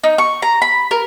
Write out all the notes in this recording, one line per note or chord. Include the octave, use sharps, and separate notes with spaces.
D#4
C#6
A#5
B5
A#4